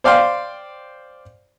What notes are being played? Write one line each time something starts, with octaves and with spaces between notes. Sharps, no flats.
C5 D5 F5 G5 C6